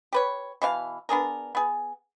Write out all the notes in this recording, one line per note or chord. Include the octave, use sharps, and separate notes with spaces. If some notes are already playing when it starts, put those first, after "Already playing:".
G4 B4 C#5
B2 E3 F5
B3 D4 G#4 A#4
B3 G#4